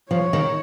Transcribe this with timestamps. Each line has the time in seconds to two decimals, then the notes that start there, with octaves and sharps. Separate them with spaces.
0.11 F3 C#5
0.33 D#3